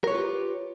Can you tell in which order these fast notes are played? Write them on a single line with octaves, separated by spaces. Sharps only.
A#4 C#5 B4 F4 G4